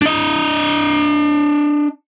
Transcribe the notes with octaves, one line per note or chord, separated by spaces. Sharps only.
D4 D#5